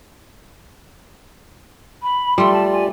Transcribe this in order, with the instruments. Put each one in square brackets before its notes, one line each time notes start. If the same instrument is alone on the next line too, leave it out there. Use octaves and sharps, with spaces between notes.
[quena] B5
[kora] G3 A3 [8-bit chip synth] F4 G4 D5 [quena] C6
[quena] A5
G#5